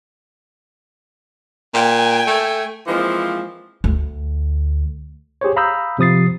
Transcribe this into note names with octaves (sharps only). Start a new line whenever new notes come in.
A#2 G5 G#5
A3
E3 F3 G#3 A#3 C4
D2
G4 G#4 C5 C#5
F5 A#5 B5 D#6 E6 G6
C3 F3 D#6 A6 C7